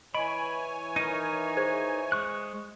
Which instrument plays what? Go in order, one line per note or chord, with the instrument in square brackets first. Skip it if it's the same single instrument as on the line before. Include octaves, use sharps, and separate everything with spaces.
[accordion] E3 C#5 G#5 [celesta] D#5 D7 [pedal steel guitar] B5
[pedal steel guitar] D#4 A#4 [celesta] D#7
[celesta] G#4 C5 G#6
[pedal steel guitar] G#3 C#6 F#6